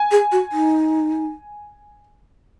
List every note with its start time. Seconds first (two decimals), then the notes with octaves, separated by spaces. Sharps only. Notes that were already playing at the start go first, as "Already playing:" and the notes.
Already playing: G#5
0.11 G#4
0.32 F#4
0.52 D#4